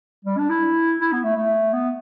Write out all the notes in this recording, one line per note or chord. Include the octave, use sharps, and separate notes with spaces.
G3
D4
E4
E4
B3
A3
A3
B3